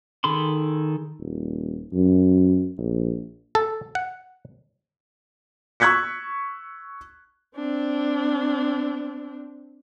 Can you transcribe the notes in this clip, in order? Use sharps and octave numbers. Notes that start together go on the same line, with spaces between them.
D#3 G#4 A4 B5 C6
D#1
F#2
A#1
A4
F#5
C#6 E6 F#6 G#6 B6 C#7
C4 D4